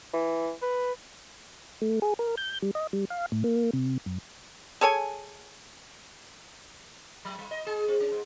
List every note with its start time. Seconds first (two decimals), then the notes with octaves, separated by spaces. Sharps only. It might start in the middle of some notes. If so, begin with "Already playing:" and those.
0.14 E3
0.62 B4
1.82 A3
2.02 G#4
2.19 A#4
2.37 G6
2.62 G3
2.75 D#5
2.93 G3
3.10 F5
3.32 A2
3.44 A#3
3.73 C3
4.06 F#2
4.81 G#4 A4 C#5 G#5
7.25 F#3
7.39 G3
7.51 D#5
7.67 G#4
7.88 C4
8.00 C#4
8.12 G#2